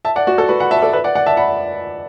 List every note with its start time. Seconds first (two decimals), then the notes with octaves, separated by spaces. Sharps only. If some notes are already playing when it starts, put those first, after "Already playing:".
0.05 E5 A5
0.16 D5 F#5
0.27 F#4
0.38 A4
0.49 F#4 B4
0.60 F#5 B5
0.71 E5 A5
0.82 A4 D5
0.93 B4 E5
1.04 D5 F#5
1.15 D5 F#5
1.26 E5 A5
1.37 F#5 B5